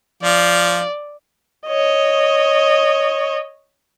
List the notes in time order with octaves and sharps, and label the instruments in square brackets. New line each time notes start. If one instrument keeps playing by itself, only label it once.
[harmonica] F3 F5 [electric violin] D5
[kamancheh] C#5 D#5